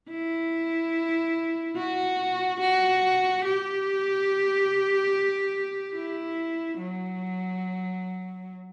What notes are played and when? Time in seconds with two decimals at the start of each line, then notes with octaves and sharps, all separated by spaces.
0.10 E4
1.76 F#4
2.60 F#4
3.44 G4
5.95 E4
6.78 F#3